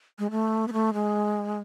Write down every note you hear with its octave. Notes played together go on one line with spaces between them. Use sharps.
G#3
A3
B3
A3
G#3